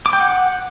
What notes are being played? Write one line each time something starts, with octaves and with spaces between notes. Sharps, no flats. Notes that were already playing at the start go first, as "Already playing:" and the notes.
D6
G5
F#5